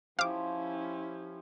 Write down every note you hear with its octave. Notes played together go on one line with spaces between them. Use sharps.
F3 C#4 E4 G4 F5 D6